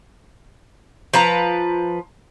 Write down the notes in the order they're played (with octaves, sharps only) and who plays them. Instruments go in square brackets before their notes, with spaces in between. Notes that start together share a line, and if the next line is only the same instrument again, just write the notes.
[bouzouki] F3 B4 A#5